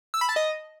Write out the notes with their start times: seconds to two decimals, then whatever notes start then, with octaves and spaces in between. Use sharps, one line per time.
0.14 E6
0.21 B5
0.29 A5
0.36 D#5